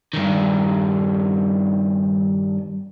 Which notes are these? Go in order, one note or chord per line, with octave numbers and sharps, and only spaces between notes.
G2 D#3